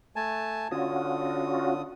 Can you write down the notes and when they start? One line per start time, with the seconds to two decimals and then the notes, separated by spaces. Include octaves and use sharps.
0.16 A3 G#5 A5
0.72 D3 C#4 F4 F#4 D#6